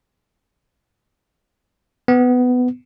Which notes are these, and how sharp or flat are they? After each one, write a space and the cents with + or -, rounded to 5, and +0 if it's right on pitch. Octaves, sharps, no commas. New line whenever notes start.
B3 +15